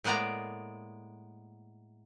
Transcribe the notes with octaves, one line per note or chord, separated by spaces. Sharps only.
A2 G#3 A#3 B3 D5 A#5